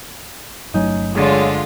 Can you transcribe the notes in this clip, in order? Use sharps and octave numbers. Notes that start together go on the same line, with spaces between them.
G1 F#3 A3 C#4 D#4
D3 G#3 F4 C#5